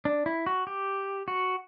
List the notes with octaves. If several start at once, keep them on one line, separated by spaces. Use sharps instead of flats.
D4
E4
F#4
G4
F#4